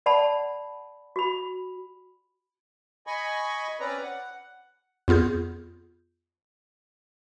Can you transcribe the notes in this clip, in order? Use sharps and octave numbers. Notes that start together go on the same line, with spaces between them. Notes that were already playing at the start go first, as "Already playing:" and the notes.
D5 F#5 A5 B5
F#4 B5
D#5 G#5 B5 C#6
C4 C#4 B4 D5 A#5
F#5
F2 B3 F4 G#4 G6